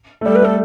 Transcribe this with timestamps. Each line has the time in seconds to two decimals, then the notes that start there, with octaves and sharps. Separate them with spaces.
0.21 A3
0.25 G3 A4
0.35 B4
0.42 A3 A4